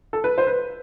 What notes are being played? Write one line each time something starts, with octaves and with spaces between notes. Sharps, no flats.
A4
B4
C5
B4